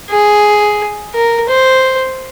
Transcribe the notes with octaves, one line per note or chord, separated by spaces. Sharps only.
G#4
A#4
C5